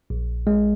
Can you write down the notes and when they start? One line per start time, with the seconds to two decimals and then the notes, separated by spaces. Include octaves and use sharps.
0.10 A#1
0.47 G#3